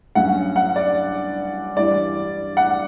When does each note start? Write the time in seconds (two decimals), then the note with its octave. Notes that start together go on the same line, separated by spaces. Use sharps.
0.15 G2 F#3 C#4 F#5
0.56 F#5
0.76 D5
1.76 G2 E3 G3 D5
2.57 F#5